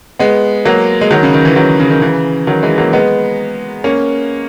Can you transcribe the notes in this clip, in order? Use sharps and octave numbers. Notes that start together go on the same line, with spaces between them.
G#3 B3
F#3 A#3
G#3
D#3 F#3
C#3
D#3
E3
D#3 F#3
C#3
D#3
C#3 E3
D#3 F#3
E3 G#3
F#3 A#3
G#3 B3
A#3 C#4